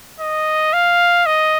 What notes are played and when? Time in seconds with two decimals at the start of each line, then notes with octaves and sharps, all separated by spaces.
0.20 D#5
0.73 F5
1.26 D#5